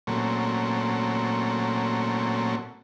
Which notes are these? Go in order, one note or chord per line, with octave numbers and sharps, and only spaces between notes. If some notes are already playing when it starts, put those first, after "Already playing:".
A#2 F#3 A3 C4 C#4